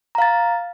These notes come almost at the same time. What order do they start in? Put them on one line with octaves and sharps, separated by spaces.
A#5 F5 A6